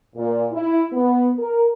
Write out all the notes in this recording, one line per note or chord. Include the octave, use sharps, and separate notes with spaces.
A#2
E4
B3
A#4